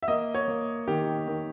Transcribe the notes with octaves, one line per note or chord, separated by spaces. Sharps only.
E5
A#3 D#5
C#5
A#3
D#3 G4
D#3